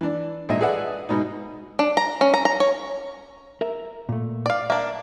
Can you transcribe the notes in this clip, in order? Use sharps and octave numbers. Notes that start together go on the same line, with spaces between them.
E3 D4
A#1 A#2 D#5 E5
G#4 A4 B4 D5 E5 F#5
G#2 B2 B3 D#4
D4
A#5
C#4
A#5
A#5
C#5
A#4 E5
A#2 A3
D5 F5
A#3 D4 E5